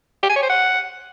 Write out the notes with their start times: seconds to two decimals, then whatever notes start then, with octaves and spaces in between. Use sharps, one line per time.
0.23 G4
0.29 G#5
0.36 C#5
0.43 C5
0.49 F#5